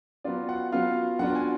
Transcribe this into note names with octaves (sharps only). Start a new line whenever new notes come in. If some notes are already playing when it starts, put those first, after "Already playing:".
F#3 B3 F4 D5
F#5
F#3 B3 F4 F5
F#3 B3 D4 F4 F#5
G#5